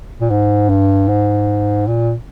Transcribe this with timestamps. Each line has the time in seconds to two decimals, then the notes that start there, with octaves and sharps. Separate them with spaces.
0.21 A#2
0.30 G#2
0.69 G2
1.08 G#2
1.87 A#2